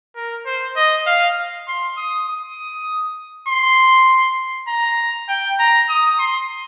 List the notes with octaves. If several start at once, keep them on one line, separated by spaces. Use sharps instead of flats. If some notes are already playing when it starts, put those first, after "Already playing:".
A#4
C5
D#5
F5
C6
D#6
D#6
C6
A#5
G5
A#5
D#6
C6